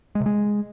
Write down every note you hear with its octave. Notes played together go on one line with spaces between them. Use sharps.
G#3
C3
G#3